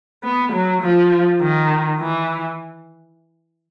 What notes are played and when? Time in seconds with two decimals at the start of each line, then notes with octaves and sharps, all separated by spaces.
0.23 B3
0.53 F#3
0.82 F3
1.41 D#3
2.00 E3